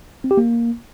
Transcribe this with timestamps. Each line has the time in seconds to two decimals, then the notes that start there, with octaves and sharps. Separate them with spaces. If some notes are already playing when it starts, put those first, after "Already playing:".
0.24 C4
0.31 G4
0.37 A#3